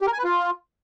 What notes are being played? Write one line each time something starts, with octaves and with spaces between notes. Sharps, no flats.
G4
A#4
G#5
B4
F4